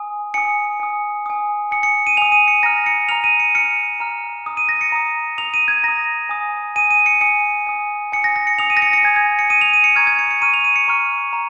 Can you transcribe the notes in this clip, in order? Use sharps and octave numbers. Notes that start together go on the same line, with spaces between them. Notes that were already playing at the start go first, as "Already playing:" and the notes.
Already playing: G#5 D#6
G#5 D#6 C#7
G#5 D#6
G#5 D#6
G#5 D#6 C#7
C#7
D#7
G#5 D#6 F7
D#7
C#7
A#5 F6 A#6
C#7
A#5 F6 F7
D#7
C#7
A#5 F6 C#7
A#5 F6
A#5 D#6
D#7
A#6
C#7
A#5 D#6
A#5 D#6 F7
D#7
G#6
A#5 D#6 A#6
G#5 D#6
G#5 D#6 D#7
D#7
C#7
G#5 D#6 C#7
G#5 D#6
G#5 D#6 C#7
A#6
A#6
C#7
G#5 D#6 F7
D#7
A#6
C#7
C#7
G#5 D#6 G#6
G#6
C#7
G#5 D#6 D#7
F7
D#7
C#7
A#5 C#6 F6 G#6
G#6
C#7
C#7
A#5 C#6 F6 D#7
F7
D#7
C#7
A#5 C#6 F6
A#5